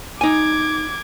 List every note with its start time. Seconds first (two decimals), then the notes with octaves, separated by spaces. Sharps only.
0.21 D#4 G#5 D6 G#6